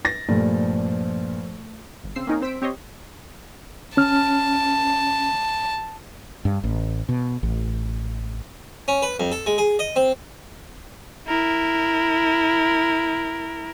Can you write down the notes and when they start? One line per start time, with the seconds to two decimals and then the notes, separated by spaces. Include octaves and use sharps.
0.05 A6 A#6
0.28 G2 A#2 F3 A3
2.04 G1
2.16 C#3 C4 E6 C7
2.27 A#3 C4 C#4 D#4 G#4 A#4
2.41 C4 C5 E6 B6 D7
2.62 C4 G4 C#5 D#5 C6
3.97 C#4 A5 F6
6.45 G2
6.64 A1
7.09 B2
7.43 A1
8.88 C#4
9.02 B4
9.20 F2
9.32 A4
9.46 G#3
9.58 G#4
9.79 D#5
9.96 C4
11.27 E4 A#4